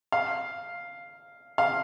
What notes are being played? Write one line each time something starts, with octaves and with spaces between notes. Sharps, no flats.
F5
F5